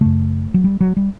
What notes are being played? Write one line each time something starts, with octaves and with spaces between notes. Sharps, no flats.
F#2 C#3 A3
F#3
G3
F#3
G3